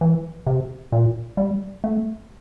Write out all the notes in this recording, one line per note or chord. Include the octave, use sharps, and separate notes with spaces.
E3
C3
A#2
G3
A3